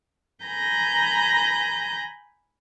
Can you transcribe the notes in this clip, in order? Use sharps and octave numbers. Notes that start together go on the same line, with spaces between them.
G#5 A#5 B5 G6 A#6